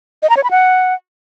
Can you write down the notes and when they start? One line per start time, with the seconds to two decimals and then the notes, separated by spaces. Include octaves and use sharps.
0.23 D#5
0.30 A#5
0.37 C#5
0.44 B5
0.51 F#5